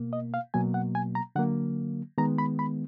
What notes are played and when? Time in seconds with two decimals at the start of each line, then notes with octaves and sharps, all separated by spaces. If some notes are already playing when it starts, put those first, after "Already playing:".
Already playing: B2 A#3
0.13 D#5
0.34 F5
0.54 B2 F#3 A#3 G#5
0.74 F#5
0.95 G#5
1.15 A#5
1.36 D3 F#3 A#3 F#5
2.18 D#3 G#3 B3 A#5
2.38 B5
2.59 B5